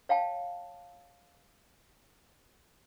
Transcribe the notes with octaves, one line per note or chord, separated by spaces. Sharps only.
C#5 F5 G5 A5